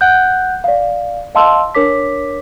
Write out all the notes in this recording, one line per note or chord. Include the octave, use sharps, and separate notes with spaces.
F#5 F#6 G6
D5 F5
D#5 F5 A5 C6 E6
D4 A#4 C#5 D6 B6